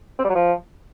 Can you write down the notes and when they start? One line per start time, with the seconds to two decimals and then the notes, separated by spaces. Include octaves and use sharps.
0.19 C4
0.24 G3
0.29 F#3
0.35 F3